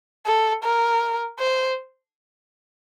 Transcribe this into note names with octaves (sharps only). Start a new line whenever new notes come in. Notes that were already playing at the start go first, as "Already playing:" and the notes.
A4
A#4
C5